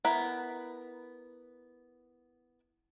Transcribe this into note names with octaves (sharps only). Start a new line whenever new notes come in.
B3 E4 A#4 B5